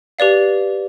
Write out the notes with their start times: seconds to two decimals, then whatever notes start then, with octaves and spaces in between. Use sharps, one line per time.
0.19 G4 B4 D5 F5